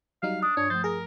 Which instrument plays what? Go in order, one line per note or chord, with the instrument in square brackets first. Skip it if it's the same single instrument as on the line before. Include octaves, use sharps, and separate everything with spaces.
[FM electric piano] F#3 G3 D#4 [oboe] F5
[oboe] D4 [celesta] D#6
[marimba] G2 [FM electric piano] D4 [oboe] C#5
[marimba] F3 A3 [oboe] C5 [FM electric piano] A6
[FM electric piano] G#4 [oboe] A#4